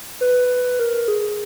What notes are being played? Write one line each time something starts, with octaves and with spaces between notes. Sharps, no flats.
B4
A#4
G#4